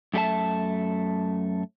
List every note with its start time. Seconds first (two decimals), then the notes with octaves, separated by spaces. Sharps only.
0.14 F#2 A3 G4 E5 A5